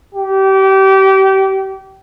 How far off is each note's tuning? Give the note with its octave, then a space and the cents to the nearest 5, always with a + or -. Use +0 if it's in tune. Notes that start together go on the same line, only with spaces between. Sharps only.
G4 -30